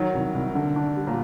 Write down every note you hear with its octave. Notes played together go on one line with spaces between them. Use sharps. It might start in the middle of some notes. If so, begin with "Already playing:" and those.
Already playing: D#3 F#3
C2
C2
D3
D4
G3
A#2